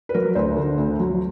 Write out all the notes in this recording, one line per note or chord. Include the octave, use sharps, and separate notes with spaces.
B4
F#3 A#4
D2 C5
D3
D2
F#3